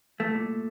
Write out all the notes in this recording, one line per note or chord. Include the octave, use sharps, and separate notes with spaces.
C2 A3
A#2